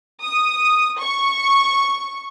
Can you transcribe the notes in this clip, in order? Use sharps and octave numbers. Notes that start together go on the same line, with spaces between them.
D#6
C#6